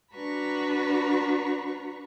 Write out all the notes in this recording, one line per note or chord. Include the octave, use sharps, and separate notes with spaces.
D4 F#4 B4 A#5 B5 C#6